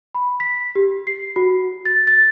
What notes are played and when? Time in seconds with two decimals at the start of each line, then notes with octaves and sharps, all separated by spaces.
0.14 B5
0.40 B6
0.75 G4
1.07 C7
1.36 F#4
1.85 A6
2.07 A6